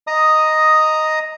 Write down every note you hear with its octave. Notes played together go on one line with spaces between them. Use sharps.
D#5 A#5 D#6